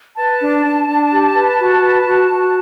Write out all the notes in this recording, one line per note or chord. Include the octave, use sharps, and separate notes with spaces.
B4 A5
D4
D4
D4
G4
B4
F#4
B4
F#4
F#4